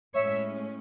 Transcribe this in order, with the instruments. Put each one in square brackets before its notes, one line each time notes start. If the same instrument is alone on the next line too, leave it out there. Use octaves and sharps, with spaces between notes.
[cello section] A2 G#3 C#4 C#5 E5